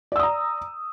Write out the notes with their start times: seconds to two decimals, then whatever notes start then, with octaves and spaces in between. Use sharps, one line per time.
0.12 D5
0.16 E6
0.19 D#6
0.23 A#5